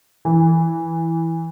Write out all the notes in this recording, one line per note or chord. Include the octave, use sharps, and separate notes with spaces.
E3